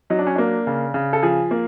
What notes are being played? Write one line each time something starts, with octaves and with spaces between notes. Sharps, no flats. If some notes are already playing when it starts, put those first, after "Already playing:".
F#3 D#4
D4
C#4
A#3 D4
C#3
C#3
A4
F3 G#4
A#3